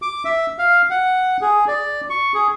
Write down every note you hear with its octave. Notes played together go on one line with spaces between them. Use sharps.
D6
E5
F5
F#5
G#4
D5
C#6
G#4